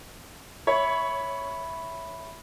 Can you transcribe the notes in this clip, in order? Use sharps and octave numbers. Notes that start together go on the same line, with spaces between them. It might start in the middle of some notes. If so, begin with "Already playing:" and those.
C#5 E5 B5